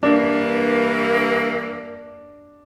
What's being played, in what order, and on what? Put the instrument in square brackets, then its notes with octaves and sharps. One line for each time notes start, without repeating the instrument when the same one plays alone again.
[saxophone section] G2 E3 A#3 [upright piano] D4